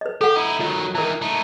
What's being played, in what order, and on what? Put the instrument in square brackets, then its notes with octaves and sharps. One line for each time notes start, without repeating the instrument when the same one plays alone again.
[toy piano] B4 D#5
[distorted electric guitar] G4 [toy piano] A4 F#5
[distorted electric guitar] D#4 E4
[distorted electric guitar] D#3 F#3 [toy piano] F4 D#5
[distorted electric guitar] D#3 E3 [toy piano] E4 A#4
[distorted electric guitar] A3 D#4